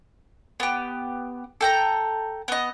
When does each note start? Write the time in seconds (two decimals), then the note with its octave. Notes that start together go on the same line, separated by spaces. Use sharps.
0.60 B3 G4
1.61 A4 G5 A#5
2.48 B3 D#5